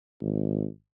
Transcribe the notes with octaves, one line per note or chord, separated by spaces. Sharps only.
G#1